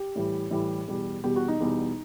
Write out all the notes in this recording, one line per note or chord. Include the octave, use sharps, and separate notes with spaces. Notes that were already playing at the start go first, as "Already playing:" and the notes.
Already playing: G4
A2 E3 G3
A2 E3 G3
E2 B2 G3
E2 B2 G3 G4
F#4
D#4
E2 B2 G3